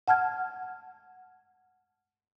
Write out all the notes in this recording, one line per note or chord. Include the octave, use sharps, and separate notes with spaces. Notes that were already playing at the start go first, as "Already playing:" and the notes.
F#5 A5 F6 G#6